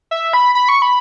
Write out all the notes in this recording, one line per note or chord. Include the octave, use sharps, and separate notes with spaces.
E5
B5
B5
C#6
B5